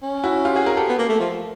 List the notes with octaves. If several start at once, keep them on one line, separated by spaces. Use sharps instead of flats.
C#4
E4 F#4
F4 G4
F#4 G#4
G#4 A#4
G4 A4
B3
A#3
A3
F3